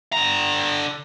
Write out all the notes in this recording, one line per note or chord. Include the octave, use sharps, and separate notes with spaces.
D3 A#5